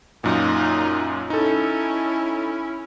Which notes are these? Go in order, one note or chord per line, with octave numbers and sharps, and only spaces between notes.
F#2 A#2 D#4 F4
C#4 D#4 E4 A4